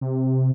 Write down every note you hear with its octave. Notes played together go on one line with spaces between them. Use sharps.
C3